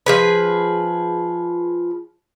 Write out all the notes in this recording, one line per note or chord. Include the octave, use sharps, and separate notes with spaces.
F3 G#4 B4